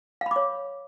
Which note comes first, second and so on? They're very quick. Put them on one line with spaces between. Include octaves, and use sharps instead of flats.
F5 B5 D6 C#5